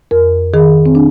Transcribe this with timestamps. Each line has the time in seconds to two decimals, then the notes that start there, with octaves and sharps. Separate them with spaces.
0.11 F2 A#4
0.54 D#3 G#4
0.86 C4
0.95 D4